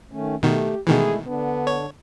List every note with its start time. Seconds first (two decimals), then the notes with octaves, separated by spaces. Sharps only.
0.12 D#3 A3 C#4
0.43 B2 D#3 A3 G4
0.87 B2 D#3 E3 G#3 A3 E4 G#4
1.27 D3 B3 D4
1.67 C#5